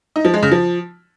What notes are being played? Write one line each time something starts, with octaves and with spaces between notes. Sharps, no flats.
D#4
F3
G#3
C#3
F3